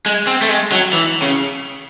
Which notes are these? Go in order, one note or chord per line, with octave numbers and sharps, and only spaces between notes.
G#3
C4
A3
G#3
F#3
E3
C#3